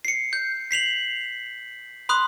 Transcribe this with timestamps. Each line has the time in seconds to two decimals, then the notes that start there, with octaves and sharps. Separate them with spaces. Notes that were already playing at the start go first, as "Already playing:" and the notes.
0.05 C7 C#7
0.33 G6
0.71 B6 C7 F7 F#7
2.09 B5 C6 D#6 F#6